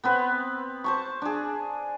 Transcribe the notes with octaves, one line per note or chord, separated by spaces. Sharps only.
B3 C4 B4
C5 A5 C#6
D4 G#4